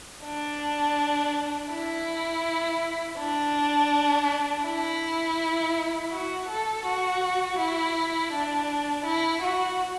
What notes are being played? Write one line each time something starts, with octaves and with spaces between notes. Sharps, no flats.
D4
E4
D4
E4
F#4
A4
F#4
E4
D4
E4
F#4